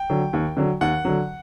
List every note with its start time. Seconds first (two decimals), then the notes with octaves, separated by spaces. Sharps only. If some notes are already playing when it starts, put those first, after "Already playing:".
Already playing: G5
0.10 D3 F#3
0.33 D#2
0.57 D3 F#3
0.81 D#2 F#5
1.05 D3 F#3